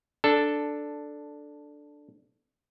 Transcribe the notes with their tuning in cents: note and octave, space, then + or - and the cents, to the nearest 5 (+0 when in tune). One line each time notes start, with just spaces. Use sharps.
D4 +0 A4 +0